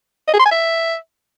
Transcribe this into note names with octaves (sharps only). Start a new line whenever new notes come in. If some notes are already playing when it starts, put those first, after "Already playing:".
D#5
G#4
C6
G#5
E5